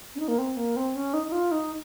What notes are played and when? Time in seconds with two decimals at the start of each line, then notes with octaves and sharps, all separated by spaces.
0.15 C#4
0.20 D#4
0.28 A#3
0.38 C4
0.57 A#3
0.76 C4
0.95 C#4
1.14 D#4
1.27 D#4
1.32 F4
1.51 D#4